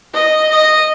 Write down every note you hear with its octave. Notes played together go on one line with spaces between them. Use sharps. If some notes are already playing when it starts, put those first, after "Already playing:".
D#5
D#5